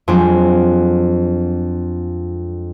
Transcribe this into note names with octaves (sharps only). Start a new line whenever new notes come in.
F2 F#3 G#3 C4 D4